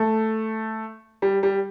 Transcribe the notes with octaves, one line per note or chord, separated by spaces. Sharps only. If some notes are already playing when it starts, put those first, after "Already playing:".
Already playing: A3
G3
G3